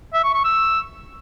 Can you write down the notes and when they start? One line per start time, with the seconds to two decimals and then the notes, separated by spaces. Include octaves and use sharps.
0.14 E5
0.24 C#6
0.35 C#6
0.45 E6